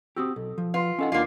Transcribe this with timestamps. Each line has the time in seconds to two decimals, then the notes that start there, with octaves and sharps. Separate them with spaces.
0.16 C4 F#4 G4 D#6 E6
0.36 B1 A4
0.58 F3
0.74 F4 B4 C6
0.99 C#4 D#4 A4 D#5 F#5 G#5
1.12 E2 A#3 D4 F4